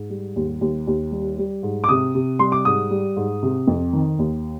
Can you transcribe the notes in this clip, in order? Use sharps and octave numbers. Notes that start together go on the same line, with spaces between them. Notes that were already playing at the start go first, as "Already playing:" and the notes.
Already playing: G#2
G3
D#2
D#2
D#2
G3
G3
G#2
D6
C3 D#6
C3
G3 C6
D6
G#2 D#6
G3
G#2
C3
F2
D#3
D#2